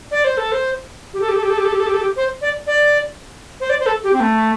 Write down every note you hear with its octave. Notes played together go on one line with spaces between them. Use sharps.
D5
C5
A4
C5
G4
A4
G4
A4
G4
A4
G4
A4
G4
A4
G4
A4
G4
C5
D5
D5
C5
D5
C5
A4
G4
C4
A3